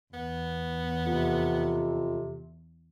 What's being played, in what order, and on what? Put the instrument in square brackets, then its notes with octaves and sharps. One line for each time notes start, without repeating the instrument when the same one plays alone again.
[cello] E2 [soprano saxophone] B3
[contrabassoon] F2 [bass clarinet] C3